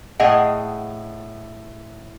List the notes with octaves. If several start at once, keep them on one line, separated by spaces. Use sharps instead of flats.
A2 G#4 D#5 F#5 G5